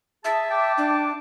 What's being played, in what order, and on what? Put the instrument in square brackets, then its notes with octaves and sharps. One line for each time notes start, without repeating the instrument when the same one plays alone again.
[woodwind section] G#4 A5 [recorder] E5
[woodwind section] G5 A5 D6
[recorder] D4